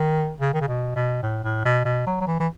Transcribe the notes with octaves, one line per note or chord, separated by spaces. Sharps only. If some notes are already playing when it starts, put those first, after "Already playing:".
Already playing: D#3
C#3
D#3
C#3
B2
B2
A2
A2
B2
B2
F#3
F#3
E3
E3